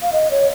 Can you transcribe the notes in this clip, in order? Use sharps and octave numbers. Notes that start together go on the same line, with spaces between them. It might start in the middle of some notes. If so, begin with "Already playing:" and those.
F5
D#5
C#5